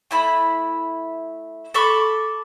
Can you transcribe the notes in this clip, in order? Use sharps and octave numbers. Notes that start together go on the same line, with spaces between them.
A3 E4 B5
A4 B5 C#6 D6